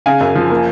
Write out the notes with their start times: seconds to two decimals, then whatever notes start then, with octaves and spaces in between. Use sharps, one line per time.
0.06 C#3 F5 G#5
0.21 F#2
0.35 F3
0.50 A#3